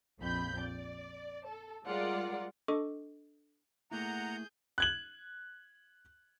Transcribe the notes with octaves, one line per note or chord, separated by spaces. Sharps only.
A#1 F2 B5 G6
D5
A4
G3 G#3 F4 A#4 D5 F#5
D4 A4 D#5 C#6 D6
A3 A#3 E4 G#4 F#5 A#5 G6
F#6 G#6 F#7